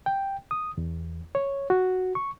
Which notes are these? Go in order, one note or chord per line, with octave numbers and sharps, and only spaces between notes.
G5
D#6
E2
C#5
F#4
C#6